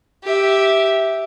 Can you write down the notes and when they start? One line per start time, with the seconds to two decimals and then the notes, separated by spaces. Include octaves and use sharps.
0.24 G4 E5